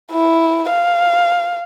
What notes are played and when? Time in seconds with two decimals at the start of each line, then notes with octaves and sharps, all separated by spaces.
0.11 E4
0.70 F5